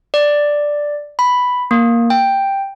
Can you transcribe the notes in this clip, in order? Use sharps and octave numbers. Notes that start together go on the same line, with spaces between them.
D5
B5
A#3
G5